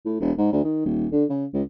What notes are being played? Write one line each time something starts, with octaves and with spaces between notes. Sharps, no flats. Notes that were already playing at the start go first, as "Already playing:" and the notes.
A2
E1
G#2
D2
D#3
D#1
D3
C#3
C#2